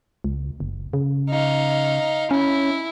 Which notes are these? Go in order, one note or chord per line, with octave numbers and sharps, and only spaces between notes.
C#2
F#1
C#3
D#4 F5
C#4 E4